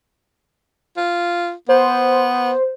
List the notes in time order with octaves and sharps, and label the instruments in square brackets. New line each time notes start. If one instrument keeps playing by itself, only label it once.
[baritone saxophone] F4
[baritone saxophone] B3 [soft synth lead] C5